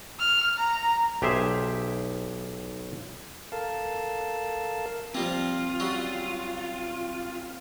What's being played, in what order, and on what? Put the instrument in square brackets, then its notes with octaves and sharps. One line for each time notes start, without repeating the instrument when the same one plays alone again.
[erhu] F6
A#5
[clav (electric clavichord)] B1 G4 G#4 C5 E5
[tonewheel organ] A4 A#4 F5 A5
[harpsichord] F3 G3 A#3 [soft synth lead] C4 [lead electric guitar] F4
[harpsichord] F#3 G3 C#4